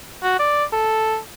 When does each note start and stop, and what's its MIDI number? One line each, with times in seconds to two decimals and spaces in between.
0.23 0.35 66
0.39 0.65 74
0.73 1.17 69